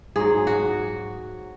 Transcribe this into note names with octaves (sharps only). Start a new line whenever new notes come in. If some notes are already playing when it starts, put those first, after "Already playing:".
G#2 F#3 G#4
F#4